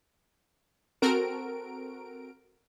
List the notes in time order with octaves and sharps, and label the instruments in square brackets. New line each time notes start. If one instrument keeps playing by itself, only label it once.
[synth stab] C4 F#4 A4 A#4 D7